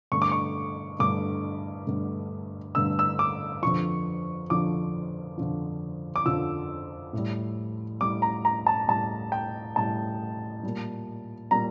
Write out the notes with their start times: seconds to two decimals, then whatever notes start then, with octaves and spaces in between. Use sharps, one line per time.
0.12 G2 D3 A3 C#6
0.22 D6
0.31 C#6
0.99 G2 D3 A3 D6
1.87 G2 D3 A3
2.75 G2 D3 A3 E6
2.99 E6
3.19 D6
3.62 F2 D3 F3 C#6
4.50 F2 D3 F3 D6
5.37 F2 D3 F3
6.16 D6
6.25 F2 D3 F3 E6
7.13 A2 G3
8.01 A2 G3 D6
8.22 A#5
8.45 A#5
8.67 A5
8.88 A2 G3 A5
9.32 G5
9.76 A2 G3 A5
10.63 A#2 G3
11.51 A#2 G3 A#5